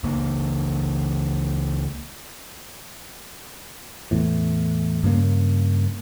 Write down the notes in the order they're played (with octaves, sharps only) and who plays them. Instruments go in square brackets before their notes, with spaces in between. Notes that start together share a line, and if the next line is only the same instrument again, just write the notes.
[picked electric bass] C#2 A#3
E2 A2
G2 C#3 A#3